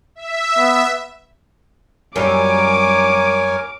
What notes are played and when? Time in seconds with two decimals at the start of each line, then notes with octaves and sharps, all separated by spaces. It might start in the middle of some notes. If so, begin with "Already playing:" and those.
0.15 E5
0.58 B3
2.16 F#2 G3 A#4 C#5 G#5 D6